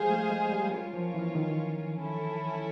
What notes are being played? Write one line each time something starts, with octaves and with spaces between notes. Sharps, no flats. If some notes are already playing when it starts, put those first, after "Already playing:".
Already playing: F3 G3 G#3 G#4 C5 F5 G#5
A3
G#3
G3
F#3 A#3 C#4 F4 A#4 C#5
F3
E3
D#3
C#4 E4 A4